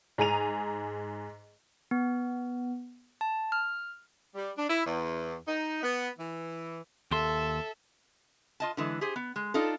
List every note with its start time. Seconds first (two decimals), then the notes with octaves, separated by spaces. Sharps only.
0.18 G#2 G#4 A#5 D#7 F7
1.91 B3
3.21 A5
3.52 F6
4.35 G3
4.56 D4
4.68 E4
4.84 E2
5.46 D#4
5.82 B3
6.17 E3
7.12 D#2 A4 E5 C6
8.60 F4 D#5 A5
8.77 D3 E3 G#3
9.01 G4 G#4 C5
9.16 B3
9.36 G#3
9.54 D4 D#4 F4 A4